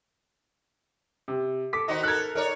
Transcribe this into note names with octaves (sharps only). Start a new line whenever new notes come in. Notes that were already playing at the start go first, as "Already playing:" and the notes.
C3
A4 D6 B6
D#3 D#4 F#4 C5 D#5
A4 A#4 F#6 G#6
D#4 A#4 C#5 D5